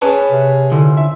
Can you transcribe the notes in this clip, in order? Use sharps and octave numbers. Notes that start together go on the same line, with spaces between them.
C#4 G#4 B4 C#5 G#5 A5
C3
D3 E3 F3
E5